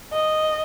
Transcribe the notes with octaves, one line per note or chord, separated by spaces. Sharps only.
D#5